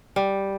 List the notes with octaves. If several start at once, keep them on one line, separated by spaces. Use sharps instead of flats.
G3